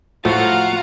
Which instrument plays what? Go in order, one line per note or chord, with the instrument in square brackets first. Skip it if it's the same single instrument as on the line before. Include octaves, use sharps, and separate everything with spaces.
[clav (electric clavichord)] A2 F3 A3 [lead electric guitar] F4 [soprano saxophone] F#4 [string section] F5 F#5 A#5